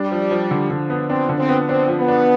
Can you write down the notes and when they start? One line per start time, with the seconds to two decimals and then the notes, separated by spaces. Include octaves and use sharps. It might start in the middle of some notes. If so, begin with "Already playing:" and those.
Already playing: G3 D4
0.11 F3
0.31 F3
0.51 D3
0.71 D3
0.90 B3
1.10 C4 D4
1.29 D3
1.38 C4
1.49 B3
1.69 C4 D4
1.88 F3
1.98 B3
2.08 D4